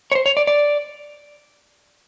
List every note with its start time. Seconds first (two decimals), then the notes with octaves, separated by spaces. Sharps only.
0.12 C#5
0.15 C5
0.26 C#5
0.37 D5
0.47 D5